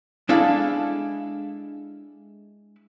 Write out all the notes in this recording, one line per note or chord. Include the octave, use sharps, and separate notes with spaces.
G#3 D4 E4 A4 F5